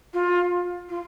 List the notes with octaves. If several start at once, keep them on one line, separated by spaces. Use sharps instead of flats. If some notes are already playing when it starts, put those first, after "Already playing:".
F4
F4